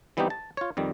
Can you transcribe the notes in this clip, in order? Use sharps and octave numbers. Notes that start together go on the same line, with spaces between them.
E3 G3 B3 C4 D#4 G4
A5
F4 C#5
F2 D#3 G3